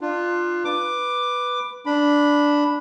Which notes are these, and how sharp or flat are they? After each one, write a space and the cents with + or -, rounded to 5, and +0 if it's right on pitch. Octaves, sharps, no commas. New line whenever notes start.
D4 +30 F4 +0
B4 +0 D6 +5
D4 -5 B5 +0